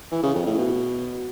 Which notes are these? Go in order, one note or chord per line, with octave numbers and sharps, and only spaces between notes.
E3
C#3
F2
A2
B2